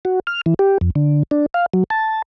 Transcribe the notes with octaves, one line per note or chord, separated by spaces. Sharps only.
F#4
F6
E3
G4
F2
D3
D4
F5
F#3
A5